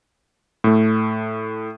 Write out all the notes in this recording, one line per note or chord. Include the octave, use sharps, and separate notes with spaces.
A2 A3